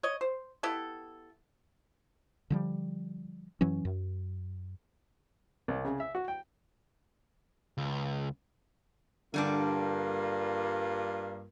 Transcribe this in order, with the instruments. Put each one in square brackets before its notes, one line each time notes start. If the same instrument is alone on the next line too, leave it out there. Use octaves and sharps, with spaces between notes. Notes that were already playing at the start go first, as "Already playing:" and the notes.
[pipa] C#5 D#5
C5
B3 E4 G4 A4
[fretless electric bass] D3 F3 G3
F#2 E3 F#3 C#4
F#2
[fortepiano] C2
C#3
E5
F#4
G5
[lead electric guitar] C#2
[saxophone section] G2 A#3 F4 [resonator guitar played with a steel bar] D3 G3 D4